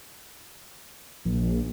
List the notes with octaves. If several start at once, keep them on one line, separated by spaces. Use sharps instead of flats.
A#1